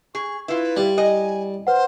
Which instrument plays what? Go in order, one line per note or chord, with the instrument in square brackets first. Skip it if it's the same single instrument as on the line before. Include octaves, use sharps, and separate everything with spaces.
[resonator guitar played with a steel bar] G#4 [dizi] C#6
[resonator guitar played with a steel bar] E4 F4 [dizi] B4
[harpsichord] G3
[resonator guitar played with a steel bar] D#5 [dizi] G#5
[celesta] B4 F#5 [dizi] C5